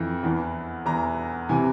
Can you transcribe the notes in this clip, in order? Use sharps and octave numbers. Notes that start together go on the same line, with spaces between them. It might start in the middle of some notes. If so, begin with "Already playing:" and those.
Already playing: F2 E3
E2 E3
E2 E3 A#5
C3 E3 G#5